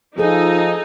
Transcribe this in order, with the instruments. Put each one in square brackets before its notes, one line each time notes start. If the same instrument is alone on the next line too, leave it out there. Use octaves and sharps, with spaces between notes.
[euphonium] F3 [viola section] D#4 [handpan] F4 G#4 A4